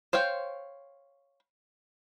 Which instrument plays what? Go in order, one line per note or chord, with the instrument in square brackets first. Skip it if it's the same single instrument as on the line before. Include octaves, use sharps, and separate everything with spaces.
[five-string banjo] C5 C#5 F5 G5